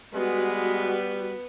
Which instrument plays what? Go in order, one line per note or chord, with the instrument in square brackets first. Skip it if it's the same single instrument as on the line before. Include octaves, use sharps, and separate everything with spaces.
[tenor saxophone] G3 [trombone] G#3 [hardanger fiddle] B3 B4 [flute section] F#4